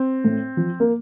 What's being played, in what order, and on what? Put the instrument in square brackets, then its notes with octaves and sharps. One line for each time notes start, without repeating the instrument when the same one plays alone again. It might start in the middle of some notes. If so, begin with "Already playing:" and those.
Already playing: [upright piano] C4
A2
F3
A#3